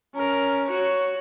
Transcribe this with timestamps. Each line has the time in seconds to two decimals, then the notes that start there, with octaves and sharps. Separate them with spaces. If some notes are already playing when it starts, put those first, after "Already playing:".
0.15 C#4 A#4
0.69 F#4 C#5